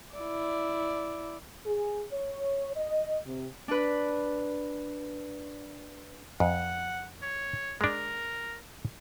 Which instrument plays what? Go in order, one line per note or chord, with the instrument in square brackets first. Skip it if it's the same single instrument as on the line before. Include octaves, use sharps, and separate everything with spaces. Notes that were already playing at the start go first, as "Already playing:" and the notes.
[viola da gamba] E4 D5
[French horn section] G#4
C#5
D#5
C3
[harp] D4 B4
[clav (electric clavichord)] F2 [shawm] F#5
[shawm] C#5
[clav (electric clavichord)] G#3 D4 [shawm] A#4